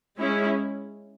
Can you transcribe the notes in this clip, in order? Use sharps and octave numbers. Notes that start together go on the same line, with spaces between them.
G#3 C#4 E4